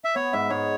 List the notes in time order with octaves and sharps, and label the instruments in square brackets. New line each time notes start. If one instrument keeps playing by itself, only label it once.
[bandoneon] E5
[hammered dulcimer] B3 [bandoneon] C#5
[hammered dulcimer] G#2 [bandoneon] E5
[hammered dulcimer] G#2 [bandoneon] C#5